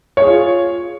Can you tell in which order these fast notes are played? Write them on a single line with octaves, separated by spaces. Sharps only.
C#5 G#4 F4